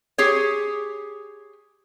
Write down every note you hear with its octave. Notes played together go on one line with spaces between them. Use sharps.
G4 G#4 C#5